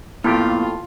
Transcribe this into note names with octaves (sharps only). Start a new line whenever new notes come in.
F2 A2 A#3 B3 E4 F4 G4